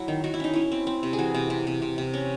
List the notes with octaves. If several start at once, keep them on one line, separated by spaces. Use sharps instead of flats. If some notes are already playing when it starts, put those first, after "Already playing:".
Already playing: F#3 E4
D#3
D#3 F#4
E4
C#4 D#4
C#4 E4
C4
C4
C3
G#4
E3 F#4
C3
C3
C3
C3
C3
C#4